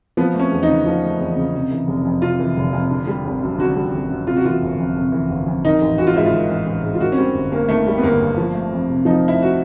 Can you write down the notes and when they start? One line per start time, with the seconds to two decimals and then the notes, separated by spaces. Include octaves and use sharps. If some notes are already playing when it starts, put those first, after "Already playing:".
0.17 F3 B3
0.34 A3
0.40 C#4
0.52 E2
0.63 D#4
0.69 C#3
0.86 F3
1.03 A3
1.19 E2
1.36 C#3
1.54 C3
1.71 E3
1.88 F1
2.05 F2
2.22 C3 F4
2.39 E3
2.57 F1
2.73 F2
2.91 D3
3.07 G3
3.25 G#1
3.43 F#2
3.58 D3 F#4
3.76 G3
3.93 G#1
4.10 F#2
4.27 C3 F4
4.37 F#4
4.45 E3 F4
4.62 G1
4.78 F2
4.96 C3
5.12 E3
5.30 G1
5.47 F2
5.65 D#3 D#4
5.82 A1
5.98 A1 F#4
6.07 F4
6.16 G#2 E4
6.25 F4
6.32 D#3
6.50 A1
6.66 A1
6.83 G#2
6.95 F4
7.00 D#3 F#4
7.12 C#4
7.18 G3 C4
7.34 G1
7.52 G2 A#3
7.69 D#3 A3
7.87 G3
7.98 B3
8.03 G1 A#3
8.21 G2
8.37 F3
8.54 A3
8.72 F2
8.89 C3
9.05 F3 D#4
9.23 A3
9.28 E4
9.42 F#4